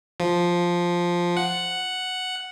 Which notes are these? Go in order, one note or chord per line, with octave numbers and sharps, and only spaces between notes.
F3
F#5